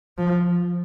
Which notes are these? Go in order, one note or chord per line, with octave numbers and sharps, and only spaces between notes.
F3